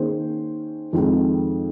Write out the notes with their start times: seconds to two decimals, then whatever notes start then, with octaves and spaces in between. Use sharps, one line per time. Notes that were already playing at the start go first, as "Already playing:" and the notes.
Already playing: D#3 A#3 C#4 G#4 C5
0.93 F2 D#3 G#3 C4